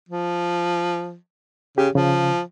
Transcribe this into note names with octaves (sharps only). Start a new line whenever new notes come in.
F3
C#3 G4
C#3 F3